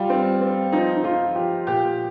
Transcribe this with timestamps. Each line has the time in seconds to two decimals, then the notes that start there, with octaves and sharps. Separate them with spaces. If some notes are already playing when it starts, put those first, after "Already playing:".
Already playing: G3 F4
0.10 C4
0.41 C4
0.72 F3 D#4
0.96 D#4
1.04 F3 F4
1.35 F3 G4
1.67 A#2 G4